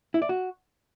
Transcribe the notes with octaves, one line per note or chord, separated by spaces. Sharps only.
E4
D5
F#4